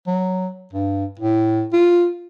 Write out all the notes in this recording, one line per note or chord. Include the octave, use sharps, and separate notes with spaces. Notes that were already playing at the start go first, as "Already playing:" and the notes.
F#3
G2
A2
F4